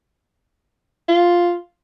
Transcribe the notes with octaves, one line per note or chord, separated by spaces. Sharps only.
F4